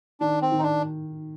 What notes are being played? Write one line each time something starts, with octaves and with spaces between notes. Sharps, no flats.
D#3 D4
C4
D#3
D#4
D4